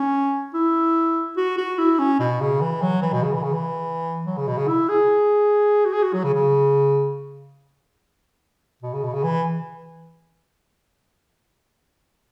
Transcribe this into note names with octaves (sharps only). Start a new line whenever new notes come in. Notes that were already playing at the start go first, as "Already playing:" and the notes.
Already playing: C#4
E4
F#4
F#4
E4
C#4
B2
C#3
E3
F#3
E3
B2
C#3
E3
C#3
E3
F#3
C#3
B2
C#3
E4
G#4
F#4
G#4
F#4
F#3
C#3
C#3
B2
C#3
B2
C#3
E3